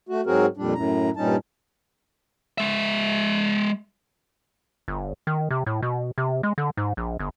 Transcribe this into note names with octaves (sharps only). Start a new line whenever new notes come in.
A3 F#4
G#2 F#3 C4 F#4 G#4 A#4
F2 A#2 G3 D4
F#2 A2 A#5
G2 A#2 G3 C#4 D#4 A5
G#3 E5
G1
D#3
C3
A2
B2
C3
G#3
D3
G#2
A#1
G1